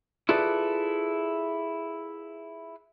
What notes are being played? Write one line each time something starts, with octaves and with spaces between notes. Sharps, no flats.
E4 F4 G#4 A4 B4 D5